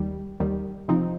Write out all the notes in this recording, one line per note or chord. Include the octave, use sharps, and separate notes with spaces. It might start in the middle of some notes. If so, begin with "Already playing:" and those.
Already playing: D#2 D#3 G3
D#2 D#3 G3
C3 F3 C4 D#4